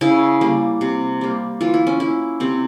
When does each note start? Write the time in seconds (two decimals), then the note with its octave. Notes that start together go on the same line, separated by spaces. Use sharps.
0.01 C#3 E4
0.41 G3 A#3
0.81 C3
1.21 G3 A#3
1.61 E3 F4
1.74 E4
1.87 C#4
2.00 A#3 E4
2.40 C3 C4